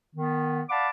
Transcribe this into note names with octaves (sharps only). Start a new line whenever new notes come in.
D#3 B3
D5 F5 F#5 A5 B5 D6